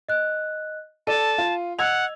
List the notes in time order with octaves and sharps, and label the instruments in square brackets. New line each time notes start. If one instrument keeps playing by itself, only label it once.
[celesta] D#5 F#6
[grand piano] A4 D5 [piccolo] A5 [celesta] D#7
[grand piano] F4
[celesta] D#5 [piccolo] F#5 [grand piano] E6 G#6 F7